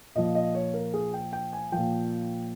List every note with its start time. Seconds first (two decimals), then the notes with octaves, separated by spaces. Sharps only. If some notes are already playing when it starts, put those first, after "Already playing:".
0.15 A#2 F3 D#5
0.35 D#5
0.55 C#5
0.74 A#4
0.94 G#4
1.14 G5
1.33 G5
1.53 G#5
1.72 A#2 F3 G5